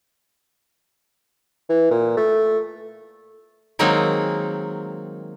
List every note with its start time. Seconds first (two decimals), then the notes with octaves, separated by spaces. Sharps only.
1.69 E3
1.90 A#2
2.17 A3
3.79 D#3 F#3 G#3 A#3 C4 D#4